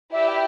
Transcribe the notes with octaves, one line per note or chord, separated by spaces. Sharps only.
E4 G4 B4 D5 E5
G5